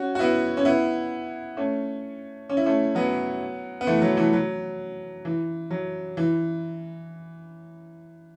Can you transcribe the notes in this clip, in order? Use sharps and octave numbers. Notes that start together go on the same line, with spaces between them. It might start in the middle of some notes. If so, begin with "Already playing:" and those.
Already playing: C#4 F#4
F#4
B3 E4
C#4
B3 E4
A3 C#4
C#4
E4
A3 C#4
F#3 B3
B3
E3 A3
F#3
E3 A3
F#3
E3
F#3
E3